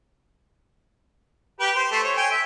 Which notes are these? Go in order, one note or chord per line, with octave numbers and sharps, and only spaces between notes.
G4 B4 G5
C5
A3 A4 C5
C#5
G5 G#5
E5